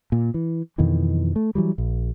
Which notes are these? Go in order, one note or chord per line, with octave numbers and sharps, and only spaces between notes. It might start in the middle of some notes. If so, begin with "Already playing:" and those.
A#2
E3
F2 B2 D#3 E3
A3
E3 F#3 G3
A#1